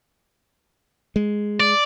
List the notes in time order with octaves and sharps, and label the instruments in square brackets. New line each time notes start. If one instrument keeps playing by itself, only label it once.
[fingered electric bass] G#3
[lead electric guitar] D5